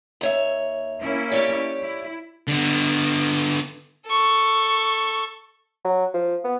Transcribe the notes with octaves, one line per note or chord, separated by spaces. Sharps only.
D#2 C#5 E5
A#3 C#4 E4
G4 C#5 D5
E4
D3 B3
A4 C#6
F#3
F3
B3